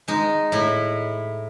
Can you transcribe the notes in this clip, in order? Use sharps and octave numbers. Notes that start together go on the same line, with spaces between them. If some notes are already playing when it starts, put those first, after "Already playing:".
G#3 D#4
A2 E4